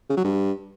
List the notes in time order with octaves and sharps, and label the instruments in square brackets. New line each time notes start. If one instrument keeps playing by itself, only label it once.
[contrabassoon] C#3
F#3
G2